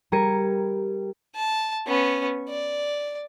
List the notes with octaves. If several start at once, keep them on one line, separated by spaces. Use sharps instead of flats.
G3 A#4 G#6 C#7 D#7
A5
B3 C#4
D5